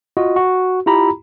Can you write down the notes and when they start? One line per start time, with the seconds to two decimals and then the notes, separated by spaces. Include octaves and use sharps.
0.17 F4 F#4 D#5
0.36 F#4
0.86 E4 F4 G4 A#5 B5